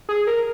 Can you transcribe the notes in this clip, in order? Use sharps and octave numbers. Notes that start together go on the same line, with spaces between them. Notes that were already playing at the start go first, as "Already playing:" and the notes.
G#4
A#4